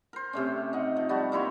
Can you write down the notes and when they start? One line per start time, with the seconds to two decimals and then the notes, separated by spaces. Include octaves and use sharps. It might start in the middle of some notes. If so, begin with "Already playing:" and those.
0.13 A#4 C5
0.33 C3 A3 C#4
0.73 D#4 F#5
0.97 F3
1.09 G3 F#4 A5
1.32 A#3 E4 C#5 C6